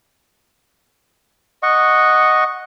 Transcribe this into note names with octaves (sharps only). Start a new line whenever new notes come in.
D#5 F#5 C#6